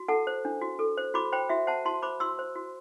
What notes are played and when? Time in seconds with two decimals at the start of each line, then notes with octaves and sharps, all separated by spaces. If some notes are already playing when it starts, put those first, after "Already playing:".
Already playing: F#4
0.08 A4 F#5 A5
0.27 C5
0.45 D4
0.62 F#4
0.79 A4
0.97 C5
1.14 F#4 B5 D6
1.32 C5 G5 B5
1.49 F#4 E5
1.67 C5 F#5 A5
1.85 F#4 A5 C6
2.02 C5 B5 D6
2.20 F#4 C6 E6
2.39 C5
2.55 F#4